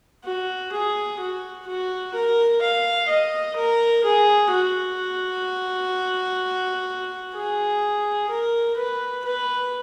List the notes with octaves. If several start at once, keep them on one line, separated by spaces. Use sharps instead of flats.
F#4
G#4
F#4
F#4
A#4
F5
D#5
A#4
G#4
F#4
G#4
A#4
B4
B4